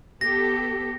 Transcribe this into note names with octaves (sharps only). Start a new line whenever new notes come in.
B3 G4 A4 A#6